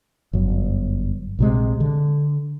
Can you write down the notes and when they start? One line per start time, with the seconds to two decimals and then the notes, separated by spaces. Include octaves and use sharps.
0.33 G1 F#2 F#3
1.39 A#1 C3 G#3
1.80 D3